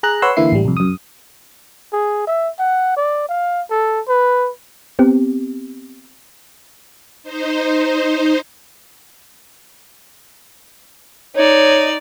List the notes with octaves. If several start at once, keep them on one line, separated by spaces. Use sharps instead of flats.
G#4 A#5 F#6
B4 C#5 F#5 C6 E6
D3 E3 A#3 E4 C7
A1 G3
C2 F2
F#2 D#6
G#4
E5
F#5
D5
F5
A4
B4
B3 C4 G4
D#4 C5
D#4 C#5 D5